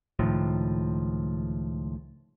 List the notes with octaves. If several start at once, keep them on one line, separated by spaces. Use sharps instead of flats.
C#2 A2 D#3 F3